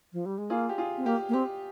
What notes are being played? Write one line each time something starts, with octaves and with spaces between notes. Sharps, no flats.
F3
G3
G#3
A#3 F4 G#4
G4
F4 G#4
C4
A#3 G4
A#3
C4 G4